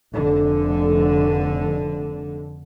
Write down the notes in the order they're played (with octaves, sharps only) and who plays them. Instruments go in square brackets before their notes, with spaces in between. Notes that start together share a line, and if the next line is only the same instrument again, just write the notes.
[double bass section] F1 D3